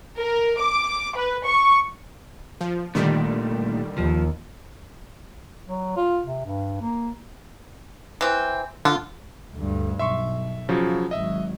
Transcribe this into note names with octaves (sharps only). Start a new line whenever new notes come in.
A#4
D6
B4
C#6
F3
A#2 D3 D#3 G3 A3
D#2 F3
F#3
F4
C3
G2
A#3
E3 C4
D3 F4
D2 G2
B1 E5 C6 C#6
C#3 F3 F#3
G#1 F#3 D#5 E5